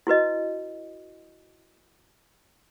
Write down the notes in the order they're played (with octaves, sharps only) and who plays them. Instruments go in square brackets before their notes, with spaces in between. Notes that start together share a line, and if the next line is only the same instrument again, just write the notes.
[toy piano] E4 F#4 B4 D#5